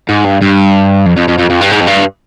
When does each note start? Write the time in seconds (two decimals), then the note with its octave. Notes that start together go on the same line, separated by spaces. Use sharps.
0.09 G#2
0.25 G2
0.42 G2
1.06 F2
1.17 F2
1.28 F2
1.39 F2
1.50 F2
1.61 G2
1.72 G#2
1.81 F2
1.87 G2